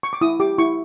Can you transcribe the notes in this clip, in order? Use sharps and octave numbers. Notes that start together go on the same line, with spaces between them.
C#6
D6
E4 D#6
G4 D6
E4 C#6